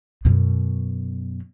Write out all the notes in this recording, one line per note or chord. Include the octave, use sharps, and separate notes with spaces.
F#2 B2